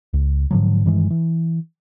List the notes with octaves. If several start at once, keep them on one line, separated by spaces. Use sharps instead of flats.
C#2
G#2 D3 F3 F#3
G2 D#3 E3 G#3
E3